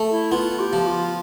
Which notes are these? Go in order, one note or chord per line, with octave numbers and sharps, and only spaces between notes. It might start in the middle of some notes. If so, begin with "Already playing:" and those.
Already playing: A3
E4
B3 F4
G4
F3
F4